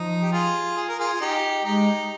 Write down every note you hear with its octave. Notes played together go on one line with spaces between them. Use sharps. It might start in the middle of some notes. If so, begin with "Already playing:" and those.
Already playing: F3 D#4
G4
F4 G#4
G#4
A#4
F4 G#4
F4
D#4 G4
G#3 D#4 G4